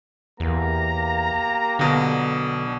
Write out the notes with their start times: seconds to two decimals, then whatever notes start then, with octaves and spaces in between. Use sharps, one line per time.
0.40 E2 A#3 G4 A#5
1.79 B1 B2 D3